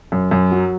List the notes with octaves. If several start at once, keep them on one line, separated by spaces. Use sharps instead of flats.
F#2
F#2
F#3